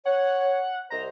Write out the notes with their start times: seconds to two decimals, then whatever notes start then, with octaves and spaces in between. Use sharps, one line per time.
0.05 C#5 F#5
0.90 C2 C5 D#5 A#5